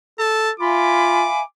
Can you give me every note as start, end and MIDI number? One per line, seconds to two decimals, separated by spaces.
0.19 0.51 69
0.19 0.50 81
0.60 1.26 65
0.60 1.41 76
0.60 1.41 77
0.60 1.41 80
0.60 1.42 83
0.60 1.46 86